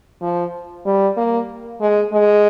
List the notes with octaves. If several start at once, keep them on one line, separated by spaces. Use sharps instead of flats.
F3
G3
A#3
G#3
G#3